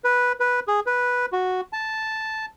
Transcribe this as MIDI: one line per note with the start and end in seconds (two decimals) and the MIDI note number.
0.04 0.32 71
0.40 0.60 71
0.68 0.80 68
0.86 1.26 71
1.33 1.61 66
1.73 2.45 81